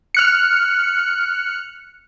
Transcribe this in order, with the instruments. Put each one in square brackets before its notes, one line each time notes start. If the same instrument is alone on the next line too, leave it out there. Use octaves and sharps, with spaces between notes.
[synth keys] F6 F#6 C#7